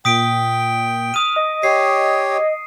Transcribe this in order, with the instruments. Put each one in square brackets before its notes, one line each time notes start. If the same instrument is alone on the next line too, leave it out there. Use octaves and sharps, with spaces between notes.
[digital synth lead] A#2 [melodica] G5 [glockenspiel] D#6 B6 D7
[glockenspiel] D#6 D#7 [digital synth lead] F6
[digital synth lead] D#5
[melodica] G4 C#5 [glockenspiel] C7